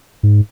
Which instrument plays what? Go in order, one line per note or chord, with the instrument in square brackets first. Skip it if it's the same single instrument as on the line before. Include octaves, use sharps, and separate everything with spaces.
[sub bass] G#2